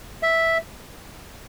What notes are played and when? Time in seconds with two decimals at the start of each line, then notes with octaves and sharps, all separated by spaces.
0.23 E5